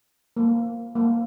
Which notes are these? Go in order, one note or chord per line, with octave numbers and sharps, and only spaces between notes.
A#3
A#3